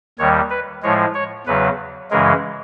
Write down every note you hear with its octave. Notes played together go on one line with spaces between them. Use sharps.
D#2 D#3 G3 C#5
B4
A2 F3 G#3 C#5
C#5
E2 C#3 F#3 B4
F#2 C#3 E3 G#3 A#4